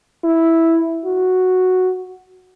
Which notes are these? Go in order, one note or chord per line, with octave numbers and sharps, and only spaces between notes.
E4
F#4